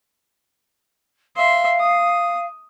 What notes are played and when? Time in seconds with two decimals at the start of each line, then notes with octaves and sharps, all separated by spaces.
1.36 E5 F5 C6
1.80 D#6